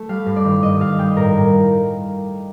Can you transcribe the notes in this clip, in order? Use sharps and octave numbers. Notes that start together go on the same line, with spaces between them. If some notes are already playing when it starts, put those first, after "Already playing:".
Already playing: A3
G3 F5
G2
D5
D#3
G2 D#5
G2 F5
G3 G5
A2 A#4
A2